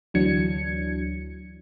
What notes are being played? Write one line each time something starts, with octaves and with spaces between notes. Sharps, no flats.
D2 E3 F#3 D4 G#6 C#7